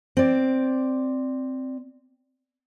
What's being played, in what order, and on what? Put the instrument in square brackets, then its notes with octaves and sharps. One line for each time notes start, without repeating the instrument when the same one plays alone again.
[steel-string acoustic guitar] C4 D5